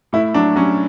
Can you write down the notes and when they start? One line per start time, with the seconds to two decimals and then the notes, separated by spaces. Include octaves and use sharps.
0.13 A2 E4
0.34 F#3 D4
0.56 F#3 C#4